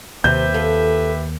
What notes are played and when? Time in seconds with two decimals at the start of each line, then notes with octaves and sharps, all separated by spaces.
0.24 D#2 C3 G4 B4 E5 G6
0.54 F4 A4